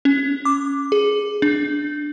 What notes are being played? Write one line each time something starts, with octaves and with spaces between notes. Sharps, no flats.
C#4
D6
G#4
D4